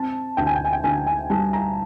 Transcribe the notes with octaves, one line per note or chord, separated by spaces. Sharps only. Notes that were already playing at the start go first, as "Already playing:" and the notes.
Already playing: C4 A5
D2 G5
G#5
G5
G#5
G5
D2 G#5
G#5
G3 A5
A#5